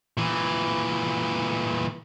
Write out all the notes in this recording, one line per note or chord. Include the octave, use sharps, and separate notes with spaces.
A#2 E3